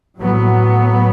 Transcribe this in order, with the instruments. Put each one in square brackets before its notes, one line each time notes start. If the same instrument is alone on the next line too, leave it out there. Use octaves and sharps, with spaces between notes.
[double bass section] A2 F#3 B3